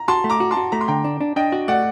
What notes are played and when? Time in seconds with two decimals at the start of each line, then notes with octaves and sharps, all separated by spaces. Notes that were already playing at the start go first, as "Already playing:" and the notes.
Already playing: A#5
0.08 F#4 A5 C6
0.24 A3
0.30 A#5 D6
0.40 F#4
0.51 A5 C6
0.57 F#4
0.72 A3 A#5
0.81 C6
0.88 D3 G5 A#5
1.04 D4
1.21 D4
1.36 D4 D#5 G5
1.52 F#4
1.68 A3 D5 F#5